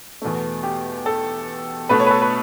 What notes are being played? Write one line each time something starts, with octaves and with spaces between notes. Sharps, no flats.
E2 B2 A3
G4
A4
B2 A3 B4
C#5
B4
A4
B4